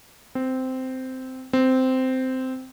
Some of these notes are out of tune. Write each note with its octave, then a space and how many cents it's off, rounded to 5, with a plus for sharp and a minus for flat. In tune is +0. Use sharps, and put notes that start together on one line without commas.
C4 -10
C4 -10